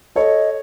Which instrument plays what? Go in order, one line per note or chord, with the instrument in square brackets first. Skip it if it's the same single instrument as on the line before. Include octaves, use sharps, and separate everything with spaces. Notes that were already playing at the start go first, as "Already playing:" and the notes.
[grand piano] A4 C#5 [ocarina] D#5